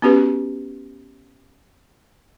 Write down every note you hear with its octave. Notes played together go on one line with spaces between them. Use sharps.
B3 C#4 F#4 G4 B4